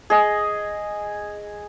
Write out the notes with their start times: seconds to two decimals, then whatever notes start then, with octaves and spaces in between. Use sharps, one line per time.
0.10 G#4 D#5